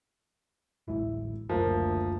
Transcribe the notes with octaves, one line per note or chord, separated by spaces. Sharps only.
A1 D2 G#3 E4
F#1 D2 F3 A#3